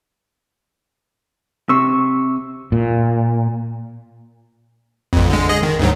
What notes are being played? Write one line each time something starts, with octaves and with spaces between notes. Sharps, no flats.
C3 C#6 E6
A#2
A1 F2
D3 G#3
G#4 D#5
D#3
D2 G#2 F#3